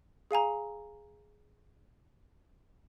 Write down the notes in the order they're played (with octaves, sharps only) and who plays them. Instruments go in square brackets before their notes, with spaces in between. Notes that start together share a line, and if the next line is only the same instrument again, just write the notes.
[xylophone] G#4 F5 G#5 A#5